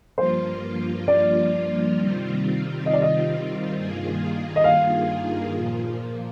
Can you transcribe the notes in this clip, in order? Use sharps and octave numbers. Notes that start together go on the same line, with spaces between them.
G2 F3 A#3 F4 C5
D5
C3 D#3 G3 C4 F4
D#5
D5
D#5
G2 D#3 A#3 F4 G#4
D#5
F5
A#2 F3 A#3